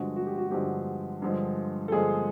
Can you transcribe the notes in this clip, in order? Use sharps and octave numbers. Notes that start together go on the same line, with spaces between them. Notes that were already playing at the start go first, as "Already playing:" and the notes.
Already playing: G2 D3 F3 G#3 F#4
F#4
G4
F#4
G2 D3 F3 G#3 G4
G2 D3 F3 G#3
A4
G2 D3 F3 G#3 G#4